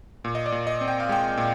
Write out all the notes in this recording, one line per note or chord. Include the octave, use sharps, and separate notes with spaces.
A#2
D#5
D5
A#2
D#5
C4
G5
F5
G#3 G5
A#2